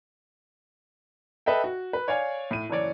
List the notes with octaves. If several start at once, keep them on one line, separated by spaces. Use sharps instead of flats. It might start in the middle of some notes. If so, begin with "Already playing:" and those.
A4 B4 D#5 E5 G5
F#4
B4
C#5 D5 F5 G#5
A2 D#7
F#1 E3 C#5 D5